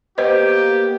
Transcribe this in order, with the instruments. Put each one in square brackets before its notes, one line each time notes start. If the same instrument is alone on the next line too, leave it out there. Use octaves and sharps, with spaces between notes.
[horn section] A#3 B3 G4 [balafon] B4 C5 D#5